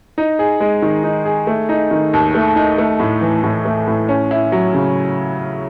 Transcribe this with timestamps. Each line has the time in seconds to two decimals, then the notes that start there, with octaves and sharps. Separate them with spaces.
0.18 D#4
0.39 G#4
0.60 G#3
0.82 D#3
1.04 D#4
1.25 G#4
1.47 A3
1.69 D#4
1.91 D#3
2.13 D#2
2.35 A3
2.56 D#4
2.78 A3
3.00 A2
3.21 E3
3.44 A2
3.65 A3
3.87 A2
4.09 C#4
4.31 E4
4.52 F#3
4.74 C#3